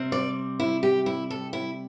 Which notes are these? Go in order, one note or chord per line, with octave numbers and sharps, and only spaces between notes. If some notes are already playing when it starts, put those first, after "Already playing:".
Already playing: C3 G3 C4
D5
E4
G4
E4
A4
E4